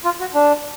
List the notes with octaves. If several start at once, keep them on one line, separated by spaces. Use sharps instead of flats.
F4
F#4
D4